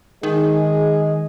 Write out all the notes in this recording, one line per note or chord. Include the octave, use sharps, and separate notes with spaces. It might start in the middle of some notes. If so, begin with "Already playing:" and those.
D#3 G#3 G#4